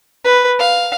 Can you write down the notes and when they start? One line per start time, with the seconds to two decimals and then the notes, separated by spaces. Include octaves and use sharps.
0.25 B4
0.59 F5